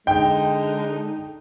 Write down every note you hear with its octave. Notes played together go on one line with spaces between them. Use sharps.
D3 G#3 D#4 G5